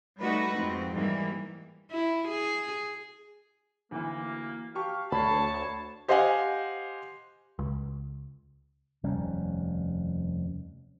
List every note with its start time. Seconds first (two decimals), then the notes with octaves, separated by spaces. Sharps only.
0.21 G3 A3 D#4 F#4 B4
0.56 F2 G#2 C4
0.93 G#2 E3 G3 A#3
1.91 E4
2.28 G#4
3.91 D2 E3 A#3
4.75 G4 F5 A5 C#6
5.12 D2 D4 F#4 C#5 A5 B5 C7
6.08 G4 C5 D#5 F5 F#5 G#5
7.59 C#2
9.03 F1 D#2 G3 C#4